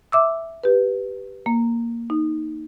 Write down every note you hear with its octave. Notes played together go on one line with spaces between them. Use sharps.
E5 D6 E6
G4 B4
A#3
D#4